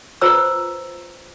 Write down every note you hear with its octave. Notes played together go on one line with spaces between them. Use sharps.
F4 B4 C5 A#5 E6